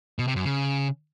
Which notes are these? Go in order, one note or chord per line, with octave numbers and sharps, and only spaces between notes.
B2
C3
F#2
C#3